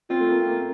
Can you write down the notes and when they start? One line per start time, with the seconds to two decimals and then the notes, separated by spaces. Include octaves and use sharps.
0.10 C4 F4
0.20 A3
0.29 A#3
0.40 C4
0.48 A#3